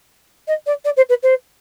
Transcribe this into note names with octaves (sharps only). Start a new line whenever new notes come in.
D#5
D5
D5
C5
B4
C5